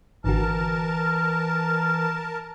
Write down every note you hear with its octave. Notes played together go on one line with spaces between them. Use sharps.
G#1 D3 E3 F#4 A#4 A5 F6